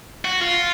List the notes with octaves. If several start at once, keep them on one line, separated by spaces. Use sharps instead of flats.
F#4
F4